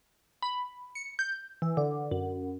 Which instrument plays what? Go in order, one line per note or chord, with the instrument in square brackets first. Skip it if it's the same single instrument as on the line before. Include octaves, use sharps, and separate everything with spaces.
[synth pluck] B5
C#7
G6
E3
D3
F#2